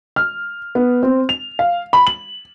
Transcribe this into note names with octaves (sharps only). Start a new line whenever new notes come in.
F6
B3
C4
F7
F5
B5
F#7